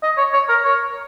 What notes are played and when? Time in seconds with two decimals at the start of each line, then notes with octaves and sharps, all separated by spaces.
0.03 D#5
0.17 C#5
0.33 C#5
0.49 A#4
0.64 C#5